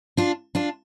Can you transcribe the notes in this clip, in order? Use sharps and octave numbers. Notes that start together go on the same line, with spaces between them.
D4 F4
D4 F4